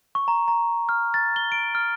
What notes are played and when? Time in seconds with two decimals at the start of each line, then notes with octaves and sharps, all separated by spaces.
0.15 C#6
0.28 A#5
0.48 A#5
0.89 F6
1.14 A6
1.36 G7
1.52 D7
1.75 F6